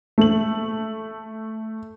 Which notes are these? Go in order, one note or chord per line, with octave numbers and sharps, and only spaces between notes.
A3 F#7